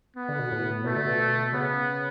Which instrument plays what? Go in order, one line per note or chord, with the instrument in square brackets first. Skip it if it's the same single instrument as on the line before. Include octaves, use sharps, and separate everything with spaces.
[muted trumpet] B3
[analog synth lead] D3
B2
A2
[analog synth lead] B2 [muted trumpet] A3
[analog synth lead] D3
B2
B2
[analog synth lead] C#3 [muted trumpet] B3